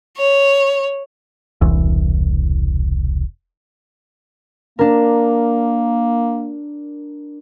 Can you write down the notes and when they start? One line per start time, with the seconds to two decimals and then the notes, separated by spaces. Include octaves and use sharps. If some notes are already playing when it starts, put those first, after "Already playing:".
0.17 C#5
1.61 E1 C2 E3
4.79 A#3 D4 A#4